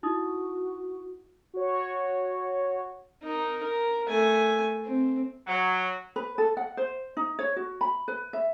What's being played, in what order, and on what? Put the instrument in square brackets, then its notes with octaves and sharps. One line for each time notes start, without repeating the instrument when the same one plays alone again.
[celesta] D#4 E4 D#6 [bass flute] F#4
[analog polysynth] F#4 C#5
[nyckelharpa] D#4 A#4
A#4
A3 G#5
C4
[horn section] F#3
[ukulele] B4
A4
F#5
C5
D#4
C#5
F#4
B5
B4
E5